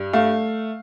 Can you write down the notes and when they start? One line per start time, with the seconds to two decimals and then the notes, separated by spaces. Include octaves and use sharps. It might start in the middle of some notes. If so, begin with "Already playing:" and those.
Already playing: G2
0.13 A3 F5